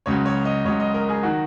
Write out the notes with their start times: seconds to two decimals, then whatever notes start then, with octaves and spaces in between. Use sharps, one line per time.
0.06 C#2 C#3 F#3 C#5
0.26 C#5
0.45 D#5
0.65 C#2 C#3 F#3 C#5
0.80 D#5
0.94 A#4
1.09 G#4
1.23 D#3 F#3 F#4